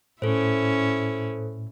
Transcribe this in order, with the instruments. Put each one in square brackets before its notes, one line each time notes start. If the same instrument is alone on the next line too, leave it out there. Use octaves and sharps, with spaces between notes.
[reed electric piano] A2 [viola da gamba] C#4 E4 [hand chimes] A4 C5